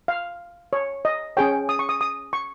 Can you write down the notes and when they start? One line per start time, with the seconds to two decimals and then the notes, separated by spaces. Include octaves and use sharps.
0.08 F5
0.73 C#5
1.05 D#5
1.37 C#4 G#4 C#5 G5
1.69 D#6
1.79 C#6
1.89 D#6
2.01 D#6
2.33 C#6